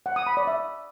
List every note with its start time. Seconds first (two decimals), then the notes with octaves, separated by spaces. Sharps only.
0.06 F#5
0.16 D#6
0.27 B5
0.37 D5
0.47 E5